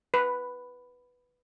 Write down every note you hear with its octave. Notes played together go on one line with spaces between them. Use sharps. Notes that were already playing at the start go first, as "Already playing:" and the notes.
B4